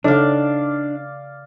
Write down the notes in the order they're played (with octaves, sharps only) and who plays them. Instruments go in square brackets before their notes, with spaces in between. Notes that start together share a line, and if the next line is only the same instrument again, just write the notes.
[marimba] C#3 A4 [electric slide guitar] D4 [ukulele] D#4 [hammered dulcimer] D5 F5